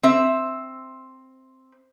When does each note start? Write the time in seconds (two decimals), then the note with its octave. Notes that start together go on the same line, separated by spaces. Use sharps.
0.03 C4 E5